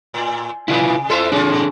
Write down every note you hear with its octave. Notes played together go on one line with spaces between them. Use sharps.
A2
C3 E4 F4 B4
A3 E4 A4 A#4 C5 E5
C#4 D4 F4 G#4 A4
G#2